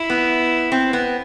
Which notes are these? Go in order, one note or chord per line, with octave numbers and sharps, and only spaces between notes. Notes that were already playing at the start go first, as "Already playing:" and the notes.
Already playing: E4
B3
C4
B3